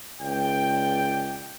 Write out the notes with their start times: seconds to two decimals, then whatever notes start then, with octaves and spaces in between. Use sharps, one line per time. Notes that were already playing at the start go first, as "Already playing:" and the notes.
0.20 C#2 D5 G5